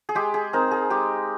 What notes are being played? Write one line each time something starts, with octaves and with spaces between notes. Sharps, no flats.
G#4
G#3 G4
G#4
C4 D#4 A#4
G#4
G#3 G4